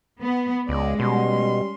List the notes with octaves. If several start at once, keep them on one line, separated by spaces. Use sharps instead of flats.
B3
C#2 G#3 G#4 D5
B2 G3 C#4 C6